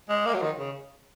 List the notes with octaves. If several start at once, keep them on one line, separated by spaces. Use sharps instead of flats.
G#3
A#3
F#3
D#3
C#3